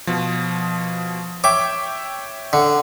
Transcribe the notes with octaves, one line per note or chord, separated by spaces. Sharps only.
B2 F3
C#5 E5 G5 D6
D3